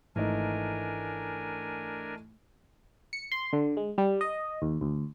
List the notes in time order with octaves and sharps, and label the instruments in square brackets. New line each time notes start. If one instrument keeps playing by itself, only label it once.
[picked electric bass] G#1 [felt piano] E3 A3 D#4 [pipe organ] D4 A#4 G#5
[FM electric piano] C#7
C6
D3
G#3
G3
D#5
D#2
D2